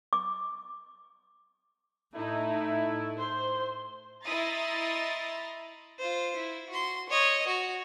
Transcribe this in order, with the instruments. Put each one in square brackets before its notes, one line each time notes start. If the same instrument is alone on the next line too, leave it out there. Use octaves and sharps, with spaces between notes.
[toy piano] D6
[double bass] A2 [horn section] A3 E4 [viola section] D#4
[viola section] C5 [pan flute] C6
[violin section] E4 D#5 A#5 C6 D#6 A6
[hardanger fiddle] F4 C5
E4
F#4 C6
C#5 D#5
F#4